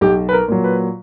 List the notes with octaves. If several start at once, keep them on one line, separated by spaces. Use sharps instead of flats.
B1 G4
B4
A#4
A#2 F#3
B4